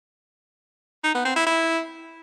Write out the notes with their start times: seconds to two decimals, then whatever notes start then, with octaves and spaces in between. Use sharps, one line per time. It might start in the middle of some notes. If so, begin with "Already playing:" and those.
1.04 D#4
1.14 B3
1.25 C4
1.36 E4
1.46 E4